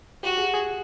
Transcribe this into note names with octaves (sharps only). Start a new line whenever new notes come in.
F#4 G4
G#4
G#4